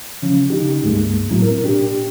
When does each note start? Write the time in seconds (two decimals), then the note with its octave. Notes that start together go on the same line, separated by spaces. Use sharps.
0.22 C#3 F3 C#4
0.50 C#3 D#4 G4
0.83 C#2 G2 G#3 A#3
1.30 A2 F#3 C4 E4
1.42 A#4
1.62 A#2 D4 G4